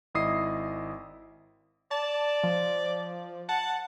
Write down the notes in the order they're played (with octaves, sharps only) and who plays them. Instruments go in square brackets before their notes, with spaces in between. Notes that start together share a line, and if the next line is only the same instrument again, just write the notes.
[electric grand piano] G#1 E4 D#5 D#6 C7
[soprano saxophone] D5 [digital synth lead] A5
[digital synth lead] F3
[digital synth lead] F#5 [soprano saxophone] A5